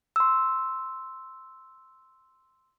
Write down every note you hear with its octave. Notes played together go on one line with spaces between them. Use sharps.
C6 E6